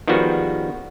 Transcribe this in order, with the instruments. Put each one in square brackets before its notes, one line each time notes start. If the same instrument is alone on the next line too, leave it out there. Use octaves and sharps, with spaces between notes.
[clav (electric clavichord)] D#3 F3 G3 G#3 B3 F#4